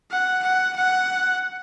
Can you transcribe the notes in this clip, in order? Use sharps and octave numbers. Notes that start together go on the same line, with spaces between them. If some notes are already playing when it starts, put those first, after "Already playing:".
F#5
F#5
F#5